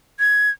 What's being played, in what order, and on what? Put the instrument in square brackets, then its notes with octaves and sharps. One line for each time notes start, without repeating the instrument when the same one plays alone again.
[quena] G#6